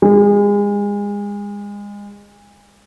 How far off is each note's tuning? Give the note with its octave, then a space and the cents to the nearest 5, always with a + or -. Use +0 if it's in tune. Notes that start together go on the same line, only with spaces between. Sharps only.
G#3 -30